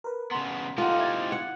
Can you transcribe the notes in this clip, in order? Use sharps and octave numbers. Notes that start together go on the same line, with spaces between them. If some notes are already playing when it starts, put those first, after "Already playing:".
A#4 B4
C#3 B3 A#5 C6 B6
C4 D#4 F4 G4 A4 F#5
E4 G#6 A6
F#5